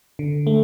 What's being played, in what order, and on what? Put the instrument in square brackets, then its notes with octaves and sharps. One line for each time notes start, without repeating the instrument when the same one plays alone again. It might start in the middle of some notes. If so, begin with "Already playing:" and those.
[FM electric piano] D3
A3